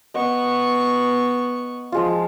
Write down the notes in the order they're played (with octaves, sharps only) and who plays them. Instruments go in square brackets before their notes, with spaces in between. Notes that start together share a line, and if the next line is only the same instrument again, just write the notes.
[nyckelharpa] B3 C#6 [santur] D#5 F#5
[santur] F3 G#3 F4